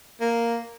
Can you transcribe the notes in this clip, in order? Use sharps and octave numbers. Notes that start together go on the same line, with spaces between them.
A#3